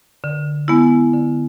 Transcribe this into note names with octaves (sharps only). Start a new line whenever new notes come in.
D3
G#3 B3 E4
D3